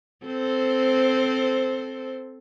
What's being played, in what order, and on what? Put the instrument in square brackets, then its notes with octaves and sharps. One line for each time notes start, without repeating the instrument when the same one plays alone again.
[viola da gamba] C4 A4 C5